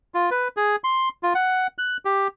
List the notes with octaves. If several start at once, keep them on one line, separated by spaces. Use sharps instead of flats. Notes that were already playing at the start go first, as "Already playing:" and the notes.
F4
B4
G#4
C6
F4
F#5
F#6
G4